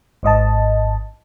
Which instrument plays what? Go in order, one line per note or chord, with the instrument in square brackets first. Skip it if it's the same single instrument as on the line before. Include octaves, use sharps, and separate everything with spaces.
[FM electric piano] G#1 G#2 D#5 A5